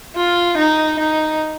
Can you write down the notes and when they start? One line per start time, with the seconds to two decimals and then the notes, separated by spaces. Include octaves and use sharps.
0.16 F4
0.57 D#4
0.99 D#4